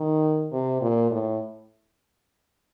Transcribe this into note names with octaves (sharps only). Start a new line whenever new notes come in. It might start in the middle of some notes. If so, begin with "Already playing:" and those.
Already playing: D#3
C3
A#2
A2